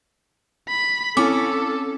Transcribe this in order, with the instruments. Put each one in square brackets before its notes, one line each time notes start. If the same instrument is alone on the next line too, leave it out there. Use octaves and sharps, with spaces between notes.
[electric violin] B5
[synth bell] C4 E4 [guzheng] C#4 [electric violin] A4 [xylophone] D6